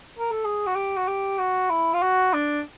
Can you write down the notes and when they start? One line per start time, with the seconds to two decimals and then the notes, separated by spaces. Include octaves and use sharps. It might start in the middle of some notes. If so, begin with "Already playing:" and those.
0.19 A#4
0.31 A4
0.45 G#4
0.67 F#4
0.75 G4
0.97 F#4
1.08 G4
1.39 F#4
1.70 E4
1.94 F4
2.02 F#4
2.33 D4